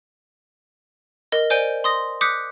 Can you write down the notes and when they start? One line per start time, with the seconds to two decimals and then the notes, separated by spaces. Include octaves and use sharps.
1.32 A#4 D#5
1.50 C5 D5 G#5 G6 D7 G7
1.84 C6 D#6 A#6
2.21 D6 D#6 F#6 G6 B6 C#7